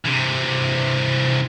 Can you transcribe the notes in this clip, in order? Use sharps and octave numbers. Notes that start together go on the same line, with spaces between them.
C3 E3